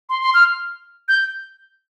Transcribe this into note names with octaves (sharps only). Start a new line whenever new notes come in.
C6
C6
F6
G6